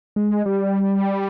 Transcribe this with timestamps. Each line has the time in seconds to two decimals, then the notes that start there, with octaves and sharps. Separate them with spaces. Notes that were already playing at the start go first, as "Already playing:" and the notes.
0.16 G#3
0.46 G3